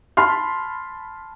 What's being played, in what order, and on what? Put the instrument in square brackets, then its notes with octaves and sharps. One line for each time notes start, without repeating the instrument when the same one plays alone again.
[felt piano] A5 B5 C6 F6